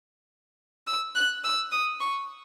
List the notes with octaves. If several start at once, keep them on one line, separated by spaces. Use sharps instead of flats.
E6
F#6
E6
D#6
C#6